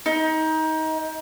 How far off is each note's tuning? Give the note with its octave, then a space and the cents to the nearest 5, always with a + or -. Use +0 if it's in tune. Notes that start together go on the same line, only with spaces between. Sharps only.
D#4 +25